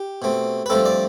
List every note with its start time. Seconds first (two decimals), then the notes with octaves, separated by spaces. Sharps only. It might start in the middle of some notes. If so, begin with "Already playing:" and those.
Already playing: G4
0.22 B2 A3 C4
0.66 B4
0.70 G2 F3 A3 C4 A4
0.85 D5